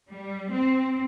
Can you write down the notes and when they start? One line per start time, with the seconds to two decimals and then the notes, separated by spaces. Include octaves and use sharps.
0.11 G3
0.55 C4